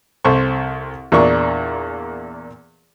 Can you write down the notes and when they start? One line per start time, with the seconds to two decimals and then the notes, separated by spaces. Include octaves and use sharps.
0.25 C2 A4 C5 C#6
1.12 E2 A#2 A#3 D4 C#6